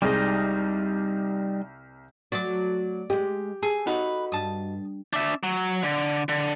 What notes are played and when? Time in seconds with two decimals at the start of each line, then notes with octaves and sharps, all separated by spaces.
0.02 C2 G3 G#3 D#4 D#5
2.32 F#3 A3 F#4 D5 D6
3.10 G#3 G4 D#5
3.63 G#4 A4
3.87 D#4 F#4 B4
4.32 G2 A5 D#6
5.13 D4 E5
5.43 F#3
5.83 D3
6.29 D3